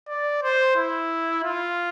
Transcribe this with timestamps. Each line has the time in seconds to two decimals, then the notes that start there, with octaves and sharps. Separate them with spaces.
0.08 D5
0.42 C5
0.76 E4
1.44 F4